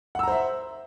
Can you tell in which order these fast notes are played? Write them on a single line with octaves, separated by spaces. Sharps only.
F#5 E6 A#5 C5 E5